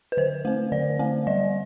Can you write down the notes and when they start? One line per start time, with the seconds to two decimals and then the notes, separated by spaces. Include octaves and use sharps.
0.12 B4
0.17 D3 C5
0.45 A3 C4
0.72 D3 D5
0.99 A3 C4
1.27 G3 D5